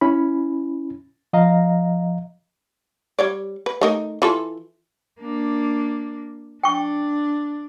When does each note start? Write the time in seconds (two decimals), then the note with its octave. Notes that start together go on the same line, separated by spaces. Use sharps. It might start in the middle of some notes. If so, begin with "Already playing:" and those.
0.01 C#4 E4 B5
1.33 F3 D#5 F5 A#5
3.19 G3 C#5 D5
3.66 B4
3.81 A3 D#4 A#4
4.22 E3 F4 A4
5.20 A#3 D4
6.64 D4 G5 C#6